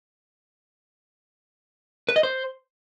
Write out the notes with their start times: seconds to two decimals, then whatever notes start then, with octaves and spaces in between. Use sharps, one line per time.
2.09 B4
2.16 D#5
2.23 C5